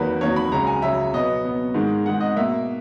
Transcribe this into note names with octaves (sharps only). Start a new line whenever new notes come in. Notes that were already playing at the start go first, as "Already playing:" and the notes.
Already playing: E2 D#3 F#3 A#3 B4
E2 D#3 F#3 A#3 C#5
B5
C#2 C#3 F#3 A#5
G#5
C#2 C#3 F#3 E5
B2 F#3 B3 D#5
B2 F#3 B3
G#2 D#3 G#3
G#2 D#3 G#3 F#5
D#5
B2 A#3 E5